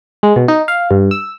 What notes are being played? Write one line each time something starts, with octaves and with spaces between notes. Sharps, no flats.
G#3
B2
D#4
F5
G2
E6